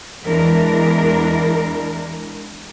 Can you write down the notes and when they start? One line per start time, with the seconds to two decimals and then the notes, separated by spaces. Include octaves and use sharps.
0.23 E2 E3 G#3 D4 A#4